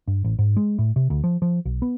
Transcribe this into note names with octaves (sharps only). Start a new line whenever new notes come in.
G2
A1
G#2
G#3
A2
C3
D2
F3
F3
B1
B3